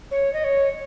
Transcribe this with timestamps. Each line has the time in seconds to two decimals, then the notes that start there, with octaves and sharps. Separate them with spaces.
0.11 C#5
0.33 D#5
0.44 C#5